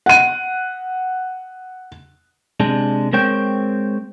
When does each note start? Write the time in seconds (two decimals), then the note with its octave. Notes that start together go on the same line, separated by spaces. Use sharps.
0.06 F#5 D#7
2.60 C3 G#3 D4
3.13 G#3 C4 A#4 C5 C#5 G5